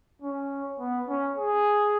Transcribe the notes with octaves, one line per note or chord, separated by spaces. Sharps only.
C#4
B3
C#4
G#4